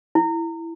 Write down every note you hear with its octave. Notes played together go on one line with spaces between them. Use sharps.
E4